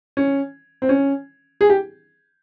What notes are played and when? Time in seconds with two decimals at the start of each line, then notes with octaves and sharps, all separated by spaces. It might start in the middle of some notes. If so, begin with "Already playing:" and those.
0.17 C#4
0.82 C4
0.89 C#4
1.61 G#4
1.70 G4